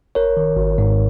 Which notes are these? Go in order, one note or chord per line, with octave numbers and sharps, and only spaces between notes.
G#1 A#4 C#5
D#3
G#1
G#2